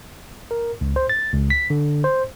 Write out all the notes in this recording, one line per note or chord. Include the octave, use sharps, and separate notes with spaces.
A#4
C#2
C5
A6
C#2
B6
D3
C5